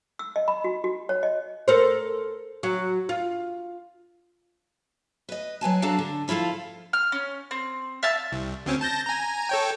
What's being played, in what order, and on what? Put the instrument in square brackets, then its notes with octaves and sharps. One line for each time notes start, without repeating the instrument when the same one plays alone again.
[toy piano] E6
D#5
B5
F#4
F#4
C#5
D#5
[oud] A4 A#4 C5
F#3
F4
[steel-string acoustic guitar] B4 D#5
F#3 B4 G#5 A5
F#3 D4 F#4 A4 F5
D3
F3 E4 F4 A4 F5
[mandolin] F6
C#4
C4
E5 F5 A5 E6
[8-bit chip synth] C2
D2 C4 C#4
A5 G6 A#6
G#5 A#5
A4 C#5 G5